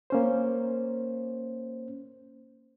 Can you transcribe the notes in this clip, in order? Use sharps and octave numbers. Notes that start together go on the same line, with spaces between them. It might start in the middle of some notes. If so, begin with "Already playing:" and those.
A#3 C#4 C5